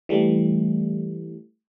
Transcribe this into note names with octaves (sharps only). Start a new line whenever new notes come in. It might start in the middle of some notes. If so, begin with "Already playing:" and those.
E3 G3 A3